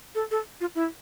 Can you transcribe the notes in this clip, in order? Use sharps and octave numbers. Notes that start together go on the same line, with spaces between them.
A4
A4
F4
E4